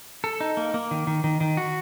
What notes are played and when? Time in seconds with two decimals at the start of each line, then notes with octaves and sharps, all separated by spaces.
0.24 A4
0.41 D#4
0.57 A#3
0.74 A#3
0.91 D#3
1.07 D#3
1.24 D#3
1.40 D#3
1.57 F#4